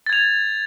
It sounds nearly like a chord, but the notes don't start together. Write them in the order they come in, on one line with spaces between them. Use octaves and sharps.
A6 G#6 F7